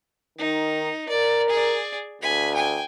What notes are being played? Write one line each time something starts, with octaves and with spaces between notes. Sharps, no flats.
D#3 D#4
A#4 D5
G#4 D5
D2 G#5 B5
G5 G#5